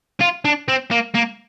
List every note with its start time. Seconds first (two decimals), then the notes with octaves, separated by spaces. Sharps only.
0.21 F4
0.45 D4
0.68 C4
0.91 A#3
1.15 A#3